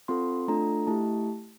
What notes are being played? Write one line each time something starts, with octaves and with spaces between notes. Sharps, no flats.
C4 F4 A4 C6
A3 D4 F4 A4 A#5
A3 E4 G4 A5